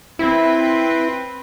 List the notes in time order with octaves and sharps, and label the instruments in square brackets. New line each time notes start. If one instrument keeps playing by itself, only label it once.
[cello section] C4 B4 [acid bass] E4